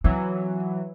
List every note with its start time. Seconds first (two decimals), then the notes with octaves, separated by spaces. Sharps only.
0.04 E3 F#3 C4